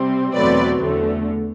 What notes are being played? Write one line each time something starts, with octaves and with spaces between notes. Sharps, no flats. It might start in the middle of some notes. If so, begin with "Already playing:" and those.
Already playing: C3 G3 C4
E2 B2 F#3 A3 C4 B4 D5
E2 D3 A3